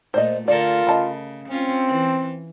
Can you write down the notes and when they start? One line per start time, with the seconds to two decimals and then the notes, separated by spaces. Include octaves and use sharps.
0.14 A#2 A3 C5 D5 D#5
0.48 D3 F4 A4 A#4 D5
0.87 C#3 D#5 A5 B5
1.49 C4 C#4 F4
1.88 E3